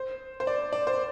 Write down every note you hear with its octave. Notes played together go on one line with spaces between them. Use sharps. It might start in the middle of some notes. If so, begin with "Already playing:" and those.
Already playing: C5
C5
D5
D5
C5